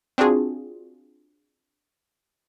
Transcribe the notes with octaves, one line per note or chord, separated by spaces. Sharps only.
C4 D4 F4 F#4 G#4